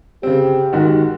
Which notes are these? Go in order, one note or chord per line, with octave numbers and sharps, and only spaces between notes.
C#3 C4 G4
G#2 D#3 F#4